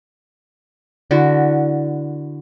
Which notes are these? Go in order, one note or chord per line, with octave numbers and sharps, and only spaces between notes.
D3 E4 F#4